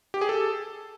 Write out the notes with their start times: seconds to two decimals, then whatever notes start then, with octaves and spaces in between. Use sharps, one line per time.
0.14 G4
0.21 G#4
0.29 A4